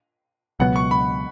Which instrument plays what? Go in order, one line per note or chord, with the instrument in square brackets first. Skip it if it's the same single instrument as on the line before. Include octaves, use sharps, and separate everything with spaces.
[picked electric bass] C#2 B2 F#3 B3 [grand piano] F#5
[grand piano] C#6
B5